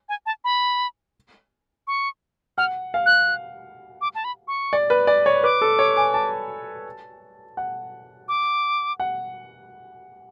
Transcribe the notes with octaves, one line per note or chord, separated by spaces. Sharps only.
G#5
A5
B5
C#6
F#5 F6
F5
F#6
D6
A5
B5
C#6
D5
B4
D5
C#5
B4 D6
A4
C#5
G#5
A5
F#5
D6
F#5